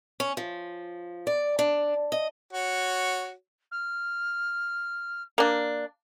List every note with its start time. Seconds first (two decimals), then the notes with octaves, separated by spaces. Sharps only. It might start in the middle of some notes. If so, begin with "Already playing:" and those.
0.20 C#4
0.37 F3
1.27 D5
1.59 D4
2.12 D#5
2.53 F#4 C#5
3.71 F6
5.38 A#3 D4